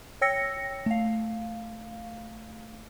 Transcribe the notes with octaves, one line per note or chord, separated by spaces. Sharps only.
C#5 G5 E6 A#6 C#7
A3 F5